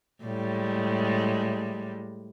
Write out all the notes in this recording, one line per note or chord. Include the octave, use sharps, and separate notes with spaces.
A2 G3 G#3